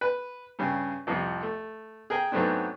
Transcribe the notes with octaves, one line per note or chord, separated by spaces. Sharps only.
B4
G2 C#3 C#4
C2 F2 C3 F3 A#3
A3
G#4 A#4 G5 G#5
G#2 F#3 A3 B3 C4 D4